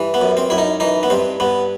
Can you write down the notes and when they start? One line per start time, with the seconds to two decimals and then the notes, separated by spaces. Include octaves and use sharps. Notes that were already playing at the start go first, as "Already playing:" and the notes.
Already playing: G2 E3
0.14 B3
0.22 F#2
0.37 C4
0.50 F#2 E4
0.58 D#4
0.80 E3 D#4
1.03 B3
1.10 G2 C4
1.40 G2 B3